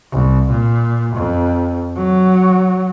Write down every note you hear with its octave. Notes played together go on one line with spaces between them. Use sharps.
C2
A#2
F2
F#3